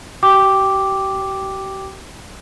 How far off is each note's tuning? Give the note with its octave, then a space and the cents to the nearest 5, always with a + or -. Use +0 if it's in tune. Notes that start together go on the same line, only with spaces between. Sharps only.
G4 -40 G5 +0 D6 +0